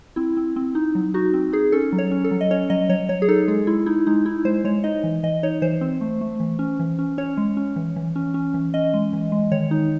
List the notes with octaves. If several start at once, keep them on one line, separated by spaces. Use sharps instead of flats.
C4 E4
C4
C4
D#4
F#3
D#4 F#4
C4
D#4 G#4
C#4 A4
F#3
C#5
C#4
A4
F#3
D#5
C#4 C#5
F#3 D#5
F#3 C#5
F#3 C#5
G#4
D#4 A4
G#3 G#4
G#3 E4
D#4 E4
G#3 D#4
D#4 E4
G#3 C5
G#3 C#5
D#4 D#5
E3
E3 D#5
D#4 C#5
E3 C5
C4
A3
A3
E3
C#4
E3
C#4
C#4 C#5
G#3
C#4
E3
E3
C#4
C#4
E3
C#4 D#5
G#3
E3
G#3
D#3 C#5
D#4